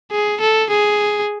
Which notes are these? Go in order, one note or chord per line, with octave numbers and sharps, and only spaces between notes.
G#4
A4
G#4